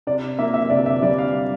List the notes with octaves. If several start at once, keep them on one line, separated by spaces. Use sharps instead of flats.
C3 D5
A#3 E5
E5
C3 D5
E5
G3 D5
F5